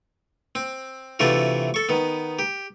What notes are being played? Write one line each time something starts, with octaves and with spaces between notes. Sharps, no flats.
C4
C3 E3 A3 D4 F4 F#4
A4 C#6
D#3 B3
G4